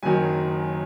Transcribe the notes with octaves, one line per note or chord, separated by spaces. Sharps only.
F#1 F#2 D#3 F#3 G#5